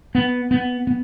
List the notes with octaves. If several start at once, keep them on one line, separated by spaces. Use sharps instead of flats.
B3
B3
B3